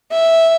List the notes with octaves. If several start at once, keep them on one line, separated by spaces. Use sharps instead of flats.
E5